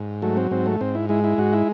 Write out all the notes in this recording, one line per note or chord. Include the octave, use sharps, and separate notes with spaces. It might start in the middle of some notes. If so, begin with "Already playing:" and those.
Already playing: G#2
F#3 A3
C4
G#2 C4
A3
G#2 C4
E4
G#3 E4
E4
G#2 F#4
E4